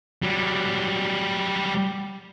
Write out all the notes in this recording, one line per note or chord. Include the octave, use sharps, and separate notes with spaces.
F#3 G3